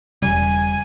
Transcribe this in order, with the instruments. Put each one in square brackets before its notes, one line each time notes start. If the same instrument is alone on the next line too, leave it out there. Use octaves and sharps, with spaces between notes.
[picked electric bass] E1 C#3 [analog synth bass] G3 [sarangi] G#5